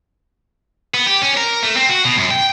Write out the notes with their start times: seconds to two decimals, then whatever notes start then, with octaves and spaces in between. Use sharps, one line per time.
0.94 B3
1.07 G4
1.22 C#4
1.37 A#4
1.63 A3
1.76 C4
1.89 F#4
2.05 B2
2.18 F#2
2.31 G5